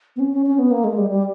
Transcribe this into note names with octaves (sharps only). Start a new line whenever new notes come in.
B3
C#4
C#4
C#4
B3
A#3
G#3
G3
G3